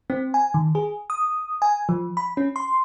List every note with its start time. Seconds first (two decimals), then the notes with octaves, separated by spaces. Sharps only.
0.10 C4
0.34 G#5
0.54 D#3
0.75 G#4
1.10 D#6
1.62 G#5
1.89 F3
2.17 B5
2.37 C#4
2.56 C6